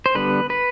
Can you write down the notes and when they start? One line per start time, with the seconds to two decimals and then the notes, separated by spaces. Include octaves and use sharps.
0.06 C5
0.15 D3 G3 B3 B4
0.50 B4